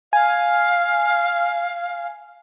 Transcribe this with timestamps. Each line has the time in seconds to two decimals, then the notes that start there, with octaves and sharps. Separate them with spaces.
0.13 F5 G#5